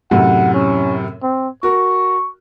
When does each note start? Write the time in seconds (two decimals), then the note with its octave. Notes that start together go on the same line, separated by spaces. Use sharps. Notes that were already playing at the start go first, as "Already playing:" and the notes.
0.11 F#2 A2 C3 F#5
0.54 C#4
1.23 C4
1.63 F#4 A#4 C#6